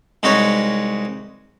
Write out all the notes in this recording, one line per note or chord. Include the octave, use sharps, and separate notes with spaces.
C2 G#3 D#4 F#4 B4 C#5